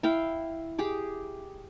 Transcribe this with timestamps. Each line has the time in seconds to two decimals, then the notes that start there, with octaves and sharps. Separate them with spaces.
0.03 E4 F5 G5
0.79 G4 G#4 D6